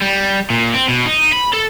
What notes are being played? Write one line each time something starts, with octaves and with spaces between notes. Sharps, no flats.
G3
A#2
C4
B2
D#4
B5
A4